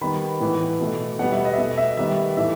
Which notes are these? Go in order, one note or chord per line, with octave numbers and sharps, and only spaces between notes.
D#3 G3 B3 B5
A2 E3 B3
B2 A3
B2 G3 B3 F#5
E5
D#5
E5
B2 A3 D#5
E5
D#3 G3 B3 E5
A2 E3 A3 E5